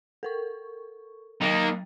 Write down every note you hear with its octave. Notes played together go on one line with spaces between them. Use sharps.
A4 A#4 C#6
F#3 A#3 D#4 G5 A6